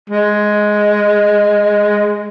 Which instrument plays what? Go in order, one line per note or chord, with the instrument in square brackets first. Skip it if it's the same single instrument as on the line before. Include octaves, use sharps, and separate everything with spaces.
[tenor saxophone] G#3